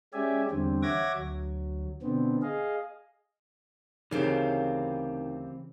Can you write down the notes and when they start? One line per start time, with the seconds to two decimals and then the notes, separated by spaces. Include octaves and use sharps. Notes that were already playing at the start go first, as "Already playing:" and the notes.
0.13 G#3 C#4 G4 D5 E5 G#5
0.51 E2 D3 G3 C4
0.83 C#5 E5 F#5 D6 G#6 A#6
1.15 D2 F#3
2.02 B2 D3 B3 C4
2.42 G#4 D#5 F5
4.11 D2 C#3 E3 C4 D#4 G4 A#4 F5